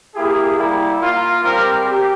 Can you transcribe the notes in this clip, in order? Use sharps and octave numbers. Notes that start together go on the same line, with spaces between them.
A#3 E4 G4 G#4
G3 A#3 E4
A#3 F4
G3 C4 G4 A#4
G4